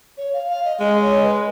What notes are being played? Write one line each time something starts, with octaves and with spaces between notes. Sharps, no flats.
C#5
F5
F5
D#5
G#3 D#5
C#5
B4